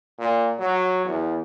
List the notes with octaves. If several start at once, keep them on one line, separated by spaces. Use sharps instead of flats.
A#2
F#3
E2